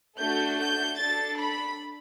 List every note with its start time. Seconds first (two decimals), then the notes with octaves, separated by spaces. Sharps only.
0.19 A3 D4 F#4 A4 G6
0.59 G6
0.98 D4 A4 A6
1.38 B5